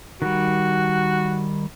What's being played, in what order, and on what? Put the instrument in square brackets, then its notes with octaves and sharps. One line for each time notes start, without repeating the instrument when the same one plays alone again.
[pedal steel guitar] D#3 G3 [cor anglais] F#4